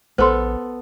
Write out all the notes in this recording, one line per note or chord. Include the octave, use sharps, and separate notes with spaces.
A#1 B3 A4 C5 C6